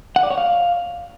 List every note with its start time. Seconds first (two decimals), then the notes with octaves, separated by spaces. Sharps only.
0.16 F#5
0.23 D5
0.30 C#5
0.38 F5